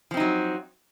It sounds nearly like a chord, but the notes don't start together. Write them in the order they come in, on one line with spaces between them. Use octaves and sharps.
F3 C4 D#4 F#3